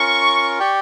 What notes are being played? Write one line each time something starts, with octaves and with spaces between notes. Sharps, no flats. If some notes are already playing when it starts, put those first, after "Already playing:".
Already playing: C#4 F4 A#4 C#6
G4 D5 G5